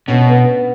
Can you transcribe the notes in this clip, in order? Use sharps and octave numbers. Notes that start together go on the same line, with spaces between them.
B2 C#4
B3